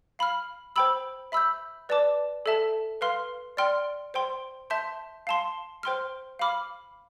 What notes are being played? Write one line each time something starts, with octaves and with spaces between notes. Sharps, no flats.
F5 B5 F6
C5 G5 B5 E6
E5 B5 E6 G6
B4 D5 A5 D6
A4 E5 A5
B4 F5 C6 F6
D5 G5 C6 F6
C5 G5 C6
E5 A5 C6 G6
F5 A5 C6
C5 G5 C6 F6
F5 B5 D6 F6